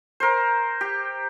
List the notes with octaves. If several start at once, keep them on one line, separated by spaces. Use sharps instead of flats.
A#4 C5
G4